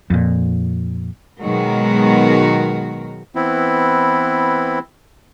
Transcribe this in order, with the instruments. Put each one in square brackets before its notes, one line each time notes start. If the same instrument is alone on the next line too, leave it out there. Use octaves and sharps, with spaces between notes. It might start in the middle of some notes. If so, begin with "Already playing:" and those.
[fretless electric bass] F2 A#2
[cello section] B2 D#3 F#3 G#3 F#4 A#4
[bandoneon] E3 B3 C4 E4